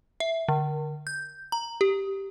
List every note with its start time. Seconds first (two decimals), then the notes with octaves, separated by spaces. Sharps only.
0.20 E5
0.48 D3
1.07 G6
1.52 A#5
1.81 G4